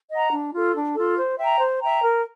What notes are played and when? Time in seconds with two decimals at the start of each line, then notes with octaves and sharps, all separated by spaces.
0.11 D#5 F#5 A#5
0.32 D4
0.53 F4 A4
0.75 D4
0.95 F4 A4
1.17 C5
1.39 E5 G5 A#5
1.59 C5
1.81 E5 G5 A#5
2.01 A#4